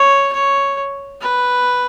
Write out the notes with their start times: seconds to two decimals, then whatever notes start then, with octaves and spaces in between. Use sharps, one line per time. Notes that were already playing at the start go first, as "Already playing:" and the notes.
Already playing: C#5
0.33 C#5
1.21 B4